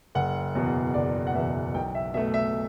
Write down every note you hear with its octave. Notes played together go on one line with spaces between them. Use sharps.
F#1 F#5
E2 B2
F#1 D5
F#5
E2 B2 E5
B1 G5
E5
B2 A3 E5
E5